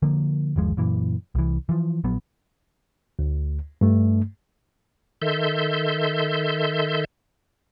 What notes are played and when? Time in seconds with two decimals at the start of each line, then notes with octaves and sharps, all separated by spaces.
0.02 D3 F3 A#3
0.56 G1 D#2 F3 G#3
0.77 F#2 A#2 E3
1.35 C2 E3
1.69 E3 F3
2.04 A#1 F#3 B3
3.19 D2
3.81 G2 A3
5.22 D#3 A4 E5 C6 G6